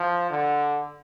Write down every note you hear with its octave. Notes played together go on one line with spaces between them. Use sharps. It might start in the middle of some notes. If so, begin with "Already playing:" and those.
Already playing: F3
D3